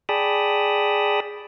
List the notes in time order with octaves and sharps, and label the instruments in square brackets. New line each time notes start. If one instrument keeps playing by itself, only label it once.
[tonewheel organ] G#4 D5 G5 A5 B5 D#6